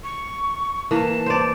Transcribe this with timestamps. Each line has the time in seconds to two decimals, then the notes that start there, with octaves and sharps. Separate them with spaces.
0.04 C#6
0.91 E3 A#3 A5
1.26 C5 D5